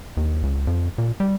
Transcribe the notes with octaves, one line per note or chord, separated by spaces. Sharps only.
D#2
C#2
F2
A#2
G3